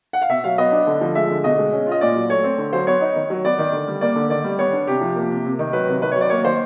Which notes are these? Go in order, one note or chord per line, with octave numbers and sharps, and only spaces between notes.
F#5
F5
B2 E5
F#3 F5
B3 D#5
D4
D3
F3
G#3 E5
D3
B2 D#5
G#3
C#4
F4 D#5
A#2 D5
F#3
A3 C#5
C4
D3
F#3 C5
B3 C#5
D#4
D#3
F#3
B3 D5
D#3
D3
G3
A#3 D5
D3
D#3 D5
G3
B3 C#5
D4
C3 G4
F3
A#3
C3
C3
D#3
F#3 B4
C3
D#3 B4
C#5
F#3
D5
A#3 C#5
D#3 C5